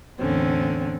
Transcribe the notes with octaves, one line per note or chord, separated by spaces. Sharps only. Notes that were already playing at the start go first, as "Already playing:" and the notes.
E2 A2 D3 C4 C#4